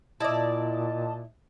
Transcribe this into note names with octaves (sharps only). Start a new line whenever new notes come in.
A#2 E4 D5 D#5 A5